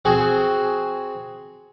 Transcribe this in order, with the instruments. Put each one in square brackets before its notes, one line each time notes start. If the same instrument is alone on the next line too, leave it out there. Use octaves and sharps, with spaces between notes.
[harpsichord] C4 F#4 G#4